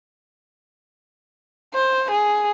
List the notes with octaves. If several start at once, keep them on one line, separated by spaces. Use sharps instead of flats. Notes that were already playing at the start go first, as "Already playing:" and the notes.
C5
G#4